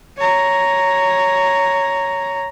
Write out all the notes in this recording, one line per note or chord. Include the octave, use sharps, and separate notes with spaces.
C#5 A#5